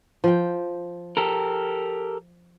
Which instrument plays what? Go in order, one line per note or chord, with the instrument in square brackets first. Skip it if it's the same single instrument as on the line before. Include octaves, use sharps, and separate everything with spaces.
[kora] F3 G5
[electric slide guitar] G4 A4 A#4